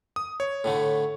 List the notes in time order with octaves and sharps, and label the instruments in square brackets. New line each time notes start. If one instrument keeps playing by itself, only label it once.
[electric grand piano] D#6
C#5
[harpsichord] A2 D3 A3